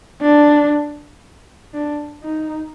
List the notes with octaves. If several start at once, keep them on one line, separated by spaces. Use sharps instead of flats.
D4
D4
D#4